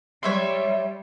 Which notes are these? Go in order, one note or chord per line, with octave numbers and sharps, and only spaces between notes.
G3 C#5 E5 C6